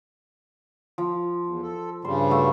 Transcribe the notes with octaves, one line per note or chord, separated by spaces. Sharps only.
F3
E2
A4
G2 C#3 G3 C5
A3 F#4